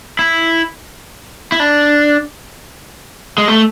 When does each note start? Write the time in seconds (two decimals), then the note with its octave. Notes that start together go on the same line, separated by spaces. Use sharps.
0.19 E4
1.52 E4
1.60 D4
3.38 G#3
3.48 A3